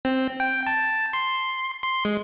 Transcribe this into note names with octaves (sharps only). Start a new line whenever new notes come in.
C4
G5
A5
C6
C6
G#3